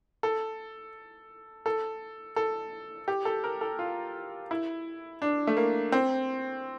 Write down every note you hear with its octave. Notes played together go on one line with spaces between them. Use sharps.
A4
A4
A4
G4
A4
A#4
A4
F4
E4
D4
A3
A#3
C4